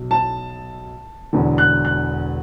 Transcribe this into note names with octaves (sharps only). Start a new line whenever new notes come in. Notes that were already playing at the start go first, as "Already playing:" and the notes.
Already playing: B1 B2
A5
E1 E2 D3
F#6
F#6